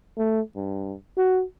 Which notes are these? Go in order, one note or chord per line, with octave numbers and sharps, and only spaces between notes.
A3
G2
F#4